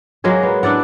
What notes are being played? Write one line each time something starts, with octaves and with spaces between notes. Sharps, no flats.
F#3 G#3 A#3 G#4
B3
D4 E4 D5 F#5